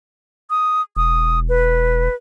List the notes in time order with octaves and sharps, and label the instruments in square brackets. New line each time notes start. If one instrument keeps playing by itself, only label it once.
[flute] D#6
[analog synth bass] E1 [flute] D#6
[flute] B4